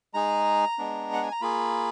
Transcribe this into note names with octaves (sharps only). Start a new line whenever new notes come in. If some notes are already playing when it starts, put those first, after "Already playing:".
G#3 D#4 G#4 A#5
G#3 B3 D4
F#5
G#5
A#5
A#3 F4 G#4 B5